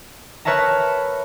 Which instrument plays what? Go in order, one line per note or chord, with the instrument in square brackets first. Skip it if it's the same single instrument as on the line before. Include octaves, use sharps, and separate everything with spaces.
[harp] A#4 B4 C#5 E5 A5 A#5